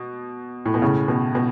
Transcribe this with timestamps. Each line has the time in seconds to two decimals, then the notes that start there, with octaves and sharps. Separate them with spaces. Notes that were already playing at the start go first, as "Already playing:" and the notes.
Already playing: B2
0.66 A2
0.74 B2
0.82 A2 C#3
1.08 B2
1.35 B2